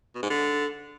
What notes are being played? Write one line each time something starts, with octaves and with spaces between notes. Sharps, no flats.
B2
G#2
D3